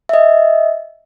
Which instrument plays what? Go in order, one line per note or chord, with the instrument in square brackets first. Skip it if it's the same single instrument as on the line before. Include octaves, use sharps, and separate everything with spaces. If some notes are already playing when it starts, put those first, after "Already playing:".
[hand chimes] D#5 E5